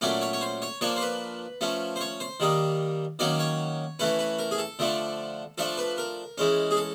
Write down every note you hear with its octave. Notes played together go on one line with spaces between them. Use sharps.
A#2 F#3 A3 C#4 D5
C#5
C#5
C5
C#5
F3 A#3 D4 C#5
C5
B4
F3 A3 C#4
C5
C#5
C5
D#3 G3 A#3 D#4
D#3 F#3 A#3 C#4 D5
C#5
E3 A3 C#4 B4
B4
A#4
G#4
A4
D3 F3 A3 D4
F3 A3 D4 A4
B4
A#4
E3 G#3 C#4
G#4
A4